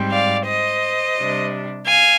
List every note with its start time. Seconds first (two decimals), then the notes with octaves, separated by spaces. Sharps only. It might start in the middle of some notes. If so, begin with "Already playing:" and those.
Already playing: G#2 G3 C4
0.12 D5 F5
0.47 C5 D#5
1.17 C3 G3 D4
1.87 F5 G#5